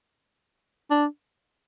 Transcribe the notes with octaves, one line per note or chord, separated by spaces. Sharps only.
D4